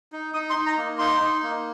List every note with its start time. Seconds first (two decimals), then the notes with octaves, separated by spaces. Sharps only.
0.12 D#4
0.34 D#4 D#6
0.50 C6
0.56 D#4
0.66 A#5
0.78 A#3
0.99 D#4 C6
1.21 D#4
1.43 A#3